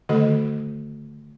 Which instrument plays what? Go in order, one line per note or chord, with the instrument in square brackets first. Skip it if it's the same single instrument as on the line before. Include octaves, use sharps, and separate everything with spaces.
[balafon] D3 D#3 A3 F#4 A4 D#5